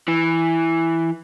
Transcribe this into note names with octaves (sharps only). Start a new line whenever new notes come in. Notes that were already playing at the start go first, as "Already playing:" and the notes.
E3